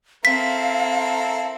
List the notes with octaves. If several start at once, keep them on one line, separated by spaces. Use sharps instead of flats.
C4 E4 A4 A#4 F5 B6